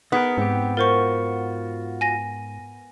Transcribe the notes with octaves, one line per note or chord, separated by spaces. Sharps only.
B3 D#4 G#4 A#4
G#2 C4 G4
F4 F#4 A#4 C5 C#6
G#5 A#6